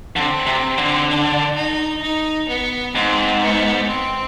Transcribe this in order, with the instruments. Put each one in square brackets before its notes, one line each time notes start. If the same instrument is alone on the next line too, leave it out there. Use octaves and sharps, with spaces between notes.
[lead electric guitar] D3 [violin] C4
[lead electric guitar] C3
D3
[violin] D4
D#4
D#4
B3
[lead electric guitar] G#2 [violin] C4
[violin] B3
C4